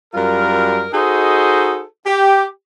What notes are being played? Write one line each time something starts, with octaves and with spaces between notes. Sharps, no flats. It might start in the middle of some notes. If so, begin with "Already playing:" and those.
F#2 G3 F4 A#4
D#4 F#4 G#4 A4 C5 D#5
G4